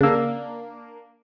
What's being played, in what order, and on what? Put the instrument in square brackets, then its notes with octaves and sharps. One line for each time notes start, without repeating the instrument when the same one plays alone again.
[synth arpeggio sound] C#3 E6 [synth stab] A#3 D4